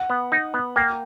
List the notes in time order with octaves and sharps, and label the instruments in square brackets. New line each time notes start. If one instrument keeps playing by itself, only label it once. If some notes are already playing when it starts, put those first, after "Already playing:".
Already playing: [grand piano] F#5
[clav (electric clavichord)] B3
D#4
B3
[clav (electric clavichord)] A#3 [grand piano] G5